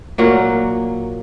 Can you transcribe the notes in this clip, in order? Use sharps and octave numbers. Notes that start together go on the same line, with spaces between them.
A#2 F#3 A#3 F#5